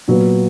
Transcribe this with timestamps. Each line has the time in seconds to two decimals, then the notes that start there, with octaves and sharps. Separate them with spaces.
0.08 A#2 F#3 B3